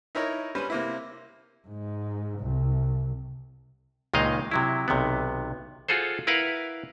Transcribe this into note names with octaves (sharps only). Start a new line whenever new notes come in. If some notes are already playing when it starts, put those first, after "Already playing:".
D#4 E4 A#4 C#5
G3 C#4 B4 C5
C3 A#3 E4
G#2
C2
C#2 A#2 D#3 G#3 D#5 F5
C3 F#3 E4
B1 C3 D#3 B3
F4 F#4 G#4 A4 C5
E4 A#4 B4 F5 F#5